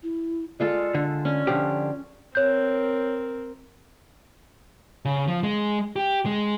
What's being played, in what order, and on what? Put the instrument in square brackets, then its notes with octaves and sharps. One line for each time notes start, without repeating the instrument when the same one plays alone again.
[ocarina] E4
[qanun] G#3 F4 A4 [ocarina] D5
[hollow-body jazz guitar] D3
[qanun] C#4 [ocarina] D5
[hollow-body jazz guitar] D3 F3 G4
[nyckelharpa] C4 A#4 [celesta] C#5 G6
[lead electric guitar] C#3
F3
G#3
G4
G#3